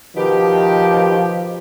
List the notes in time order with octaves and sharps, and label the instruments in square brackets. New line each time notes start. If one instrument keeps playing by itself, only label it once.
[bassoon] B2 [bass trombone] D#3 [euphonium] F3 [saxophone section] G4